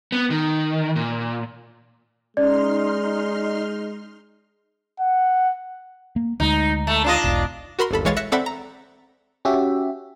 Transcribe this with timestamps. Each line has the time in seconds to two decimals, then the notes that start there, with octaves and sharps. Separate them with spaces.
0.12 B3
0.30 D#3
0.96 A#2
2.37 G#3 C#4 D#4 D5 C6 F6
5.00 F#5
6.16 A#3
6.40 D2 F#3 G#3 D#4
6.87 A3
7.04 D4 F4 D#5
7.24 E1 B1
7.79 F#4 A#4 B5 C6
7.91 G1 D#2 A4 B5
8.05 B1 E3 G#3 C#5 F5 A6
8.17 E5 F#6 A#6 C#7
8.32 C4 A4 D5 E5 F#5 B5
8.46 A#5
9.45 C#4 F#4 G4 E5